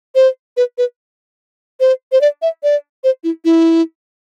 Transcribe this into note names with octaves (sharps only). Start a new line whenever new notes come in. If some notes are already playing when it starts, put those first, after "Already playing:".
C5
B4
B4
C5
C5
D5
E5
D5
C5
E4
E4